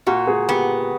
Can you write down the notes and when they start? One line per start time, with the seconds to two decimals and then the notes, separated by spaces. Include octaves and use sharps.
0.07 A#2 F#4
0.27 G#4
0.49 B3 G4